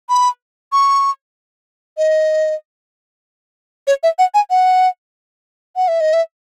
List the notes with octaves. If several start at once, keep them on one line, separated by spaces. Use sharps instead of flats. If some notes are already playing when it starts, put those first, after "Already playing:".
B5
C#6
D#5
C#5
E5
F#5
G#5
F#5
F#5
E5
D#5
E5